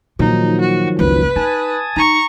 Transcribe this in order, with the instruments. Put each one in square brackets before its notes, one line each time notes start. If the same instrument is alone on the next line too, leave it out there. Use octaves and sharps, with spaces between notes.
[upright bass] A#2 [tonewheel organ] D#3 F3 F#3 [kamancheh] D#4
[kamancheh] F#4
[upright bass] F#1 C#2 [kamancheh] B4
[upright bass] D#4 [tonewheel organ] G#5 A5 D#6
[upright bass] D#4 [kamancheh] A#5 C#6